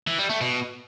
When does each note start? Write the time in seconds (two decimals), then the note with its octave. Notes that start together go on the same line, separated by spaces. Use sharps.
0.07 E3
0.18 G3
0.30 A3
0.41 B2